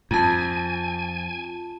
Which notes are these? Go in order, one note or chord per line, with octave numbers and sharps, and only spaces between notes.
F2 F4 G#5 A5